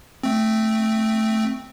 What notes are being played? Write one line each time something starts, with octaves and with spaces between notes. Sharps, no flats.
A3 C4